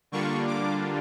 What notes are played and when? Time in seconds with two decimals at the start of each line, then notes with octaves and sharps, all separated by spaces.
0.12 D3 G3 A#3 D4 F4 C#6
0.48 D6